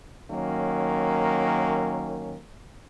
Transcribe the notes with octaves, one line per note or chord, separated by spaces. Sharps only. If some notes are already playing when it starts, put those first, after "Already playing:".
D#3 F#3 A#3 C#4